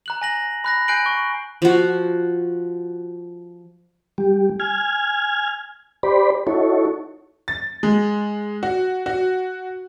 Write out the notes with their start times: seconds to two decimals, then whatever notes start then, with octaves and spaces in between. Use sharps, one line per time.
0.06 A#5 F#6 F#7
0.22 G#5 A#6 F#7
0.64 B5 F#6 A#6
0.88 G#5 F#6 G6 C7 D7 F#7
1.06 C#6
1.62 F3 F#4
4.18 G3 G4
4.60 G#5 F6 G#6
6.03 G4 C5 D5 B5
6.47 D#4 E4 F#4 A4 C#5
7.48 A6
7.83 G#3
8.63 F#4
9.06 F#4